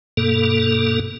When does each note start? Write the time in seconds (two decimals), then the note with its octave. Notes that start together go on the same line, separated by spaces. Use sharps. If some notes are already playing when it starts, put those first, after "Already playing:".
0.17 G2 B2 A#3 A4